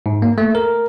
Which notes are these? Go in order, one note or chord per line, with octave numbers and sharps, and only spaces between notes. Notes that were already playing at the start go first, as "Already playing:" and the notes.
G#2
A#3
A3
A#4